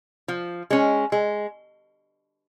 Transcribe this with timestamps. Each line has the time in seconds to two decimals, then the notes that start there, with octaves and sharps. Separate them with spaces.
0.28 F3
0.71 G#3 C#4
1.12 G#3